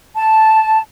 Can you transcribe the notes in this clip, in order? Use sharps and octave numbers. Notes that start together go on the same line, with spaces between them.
A5